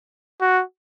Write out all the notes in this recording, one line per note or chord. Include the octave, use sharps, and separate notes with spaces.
F#4